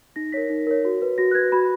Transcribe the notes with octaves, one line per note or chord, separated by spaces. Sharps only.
D#4 A#6
A#4 C#5 B6
D#4
A#4 C#5
F#4
B4
F#4 A#6
F#6
B4 G#6
F#4 B5